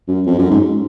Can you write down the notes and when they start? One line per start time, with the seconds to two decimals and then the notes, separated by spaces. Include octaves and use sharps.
0.08 F#2
0.27 F2
0.39 F#2
0.51 G#2